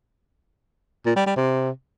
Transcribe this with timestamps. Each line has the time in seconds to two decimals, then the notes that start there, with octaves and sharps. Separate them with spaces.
1.06 A#2
1.16 G3
1.26 G3
1.36 C3